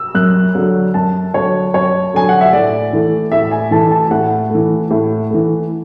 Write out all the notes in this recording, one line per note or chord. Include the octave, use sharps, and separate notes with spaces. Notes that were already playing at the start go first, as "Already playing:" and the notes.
Already playing: E6
F#2 F#6
D3 F#3
F#2 A5
D3 F#3 C#5
F#2 C#5
D3 F#3 G#5
F#5
E5
A2 D5
E3 A3
A2 E5
G#5
E3 A3 A5
A5
A2 F#5
E3 A3
A2
E3 A3